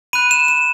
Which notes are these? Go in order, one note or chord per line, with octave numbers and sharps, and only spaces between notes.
B5 F#6 D#7
E7
E7